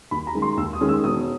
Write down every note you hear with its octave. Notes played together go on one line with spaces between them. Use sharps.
D#2 B5
A#5
D#3 G#3 C#4
C6
D#2 E6
D#6
D#3 G#3 C#4
E6
E1 D#6